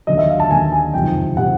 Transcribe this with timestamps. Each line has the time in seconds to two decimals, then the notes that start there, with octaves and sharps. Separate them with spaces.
0.07 D#2 D3 F#3 D#5
0.18 E5
0.29 F5
0.40 A5
0.50 D#2 D3 F#3 G#5
0.72 G#5
0.94 F#1 F2 C3 D#3 G5
1.37 C3 D#3 F#5